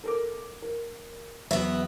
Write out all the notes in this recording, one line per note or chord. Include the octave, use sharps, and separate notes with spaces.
A4 A#4 D6
A#4
E2 F#3 B3 E5